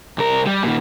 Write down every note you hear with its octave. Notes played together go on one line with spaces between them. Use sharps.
C2 A#4
G3
A#2 D#3